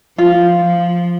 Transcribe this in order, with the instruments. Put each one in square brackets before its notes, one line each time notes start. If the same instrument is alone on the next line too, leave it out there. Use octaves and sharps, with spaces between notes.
[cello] F3 [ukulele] F4
[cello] F3